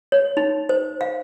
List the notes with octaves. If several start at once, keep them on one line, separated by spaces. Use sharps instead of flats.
C#5
D#4
C5
F5